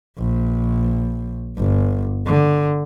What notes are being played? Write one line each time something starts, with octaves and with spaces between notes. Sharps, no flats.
A#1
G1
D3